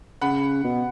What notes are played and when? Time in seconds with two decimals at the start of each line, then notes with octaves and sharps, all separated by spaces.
0.21 C#3 F#5 B5
0.64 B2